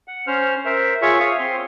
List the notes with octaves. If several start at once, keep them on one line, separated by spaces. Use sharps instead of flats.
F#5
C#4 C5 F6
A#4 C5 E5
F4 G#4 C#5 E5 C#6
F5 D#6
C4 C6